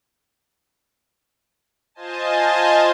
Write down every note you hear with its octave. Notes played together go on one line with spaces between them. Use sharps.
F4 C5 D#5 G#5 A5